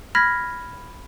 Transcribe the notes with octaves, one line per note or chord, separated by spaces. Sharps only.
B5 F6 G#6 A#6 B6